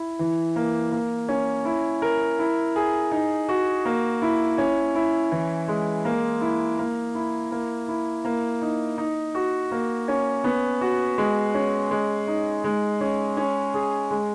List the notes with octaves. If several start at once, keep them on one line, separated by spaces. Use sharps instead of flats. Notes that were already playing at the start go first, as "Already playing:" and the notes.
Already playing: E4
E3
A#3
A#3
C#4
E4
A#4
E4
G#4
D#4
F#4
A#3
E4
C#4
E4
E3
G#3
A#3
E4
A#3
E4
A#3
E4
A#3
D#4
D#4
F#4
A#3
C#4
B3
F#4
G#3
C#4
G#3
D#4
G#3
C#4
C#4
G#4
G#3